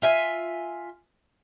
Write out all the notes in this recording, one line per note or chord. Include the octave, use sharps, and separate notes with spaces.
F4 E5 G#5